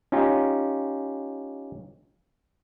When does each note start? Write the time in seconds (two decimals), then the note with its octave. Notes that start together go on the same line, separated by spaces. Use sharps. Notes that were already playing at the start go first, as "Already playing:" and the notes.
0.12 C#4 D#4 F4 G4